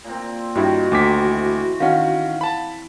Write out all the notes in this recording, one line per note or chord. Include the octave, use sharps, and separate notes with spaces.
A#2 A#3 C4
G2 D#3 E4 F#4 G5
D2 A#5 C6 D6 B6
E3
D#3 C#4 F5 F#5
A5 B5